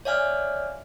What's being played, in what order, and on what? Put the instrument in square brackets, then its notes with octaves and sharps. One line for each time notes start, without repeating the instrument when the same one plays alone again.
[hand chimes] C#5 D5 E5 F5 G#5 F6